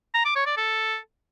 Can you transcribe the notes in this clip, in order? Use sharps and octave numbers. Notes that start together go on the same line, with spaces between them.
A#5
D6
C#5
D5
A4